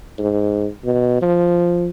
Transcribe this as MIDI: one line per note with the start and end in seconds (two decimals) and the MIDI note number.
0.19 0.67 44
0.85 1.19 47
1.21 1.89 53